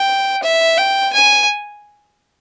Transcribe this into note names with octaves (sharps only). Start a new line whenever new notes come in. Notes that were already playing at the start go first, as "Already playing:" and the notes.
Already playing: G5
E5
G5
G#5